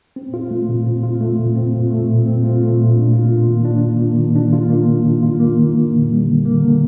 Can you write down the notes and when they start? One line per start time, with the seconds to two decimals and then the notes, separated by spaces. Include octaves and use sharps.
0.16 C4
0.34 F4
0.51 A3
0.69 A#2
0.86 C4
1.03 F4
1.21 A3
1.39 A#2
1.56 C4
1.73 F4
1.90 A3
2.09 A#2
2.26 C4
2.44 F4
2.61 A3
2.78 A#2
2.96 D4
3.13 F4
3.31 A#3
3.48 D#3
3.65 D4
3.83 F4
4.00 A#3
4.18 D#3
4.35 D4
4.53 F4
4.70 A#3
4.88 D#3
5.05 D4
5.23 F4
5.40 A#3
5.57 D#3
5.75 A#3
5.92 D3
6.10 G3
6.28 D3
6.45 A#3
6.62 D3